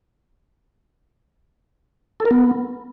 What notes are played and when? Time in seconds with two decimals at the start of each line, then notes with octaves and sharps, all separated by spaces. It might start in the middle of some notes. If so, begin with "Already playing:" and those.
2.20 A4
2.25 A#4
2.31 B3